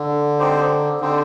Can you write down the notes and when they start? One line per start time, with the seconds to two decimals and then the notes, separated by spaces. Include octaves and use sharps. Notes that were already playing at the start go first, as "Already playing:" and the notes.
Already playing: D3
0.39 C4 D#4 G4 C5
1.01 D3 C4 D#4 G4 C5